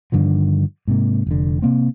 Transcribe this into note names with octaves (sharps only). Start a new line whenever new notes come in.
G2 D3 D#3 F3
G#2 C3 A#3
F1 D3
C3 A#3 C4